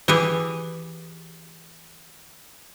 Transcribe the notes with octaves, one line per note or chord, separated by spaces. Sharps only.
E3 G4 G#4 B4